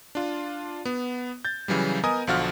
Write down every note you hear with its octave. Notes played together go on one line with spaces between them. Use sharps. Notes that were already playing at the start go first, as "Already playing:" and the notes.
D4 F4
B3
G6 A6
C#3 E3 F#3 G3
B3 A#4 D#5 G#5 D#6
B1 D3 F3 F4 F#4 F6